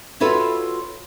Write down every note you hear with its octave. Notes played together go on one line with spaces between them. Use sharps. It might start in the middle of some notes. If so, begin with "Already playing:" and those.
F4 F#4 A4 B4 C#5 E5